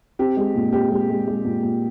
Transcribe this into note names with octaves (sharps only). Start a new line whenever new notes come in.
C4 G4
G#3
A#2
C4 G4
G#3
G#3
G#3
A#2
A#2